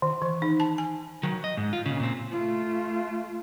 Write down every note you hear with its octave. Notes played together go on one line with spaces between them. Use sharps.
D#3
E3
D#4
A5
G#5
D#3 F#3
D#5
G#2
F4
A#2 C#3
A#2 C4
A3 F4